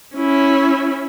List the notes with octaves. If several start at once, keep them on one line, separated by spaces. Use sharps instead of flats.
C#4 E4